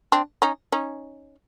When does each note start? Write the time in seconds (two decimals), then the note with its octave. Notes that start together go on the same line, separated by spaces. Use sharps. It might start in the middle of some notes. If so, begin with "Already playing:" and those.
0.12 C4 D4
0.42 C#4 D#4
0.72 C#4 D#4